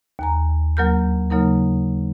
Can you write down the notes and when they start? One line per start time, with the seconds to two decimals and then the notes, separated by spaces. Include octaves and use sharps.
0.19 D#2 G#5 A#5
0.77 D2 F#3 A#3 A#4 F6 G6
1.30 C#3 F#3 A#3 D#4 A#4